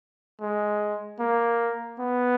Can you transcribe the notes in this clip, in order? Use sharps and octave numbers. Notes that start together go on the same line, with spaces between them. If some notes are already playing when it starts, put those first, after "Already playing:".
G#3
A#3
B3